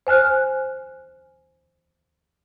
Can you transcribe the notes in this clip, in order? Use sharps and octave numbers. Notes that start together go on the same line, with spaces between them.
C5 G#5 F6 F#6